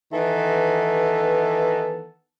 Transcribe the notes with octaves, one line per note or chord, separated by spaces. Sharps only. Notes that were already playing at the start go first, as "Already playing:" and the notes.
D#3 E3 B3 A4